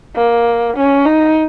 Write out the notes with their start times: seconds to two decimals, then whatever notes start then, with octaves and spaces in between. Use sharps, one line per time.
0.15 A#3
0.77 C#4
1.06 D#4